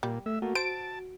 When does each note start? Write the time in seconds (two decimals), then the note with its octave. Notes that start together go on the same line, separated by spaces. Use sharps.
0.03 A#2 G3
0.26 A3 E5
0.42 A3 A#3 F#4
0.55 C5 A5 D7